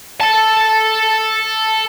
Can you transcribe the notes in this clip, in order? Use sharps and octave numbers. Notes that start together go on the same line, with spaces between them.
A4 A5